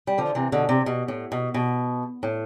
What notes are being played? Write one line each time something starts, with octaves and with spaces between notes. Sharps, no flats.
G3
D3 F3
C3 E3
B2 D3
C3
B2
A2
B2
B2
A2